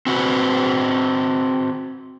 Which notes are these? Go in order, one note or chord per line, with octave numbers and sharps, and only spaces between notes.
C4 F#4 B4 C5